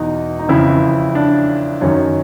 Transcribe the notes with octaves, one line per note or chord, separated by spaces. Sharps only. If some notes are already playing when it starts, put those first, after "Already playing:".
Already playing: E2 B2 D#4
D#4
F2 C#3 E3 E4
D4
F#2 D#3 C#4